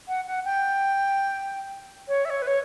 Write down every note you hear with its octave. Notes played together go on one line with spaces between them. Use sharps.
F#5
F#5
G5
C#5
E5
C#5
B4
C#5